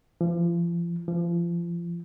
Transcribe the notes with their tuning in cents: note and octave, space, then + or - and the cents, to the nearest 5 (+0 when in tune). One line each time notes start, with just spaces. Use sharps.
F3 -35
F3 -30